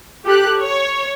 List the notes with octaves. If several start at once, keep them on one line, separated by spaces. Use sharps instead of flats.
G4 A4 F#6
C#5